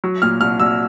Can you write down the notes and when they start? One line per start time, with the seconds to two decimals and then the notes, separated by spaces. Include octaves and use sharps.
0.04 F#3
0.22 A#2 F6
0.41 C2 F6
0.60 C2 E6